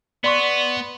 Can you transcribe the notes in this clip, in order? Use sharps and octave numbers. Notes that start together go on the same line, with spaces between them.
B3 D5 C6 C#6